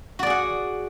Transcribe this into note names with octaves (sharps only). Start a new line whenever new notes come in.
F#4 G#4 D5 F#5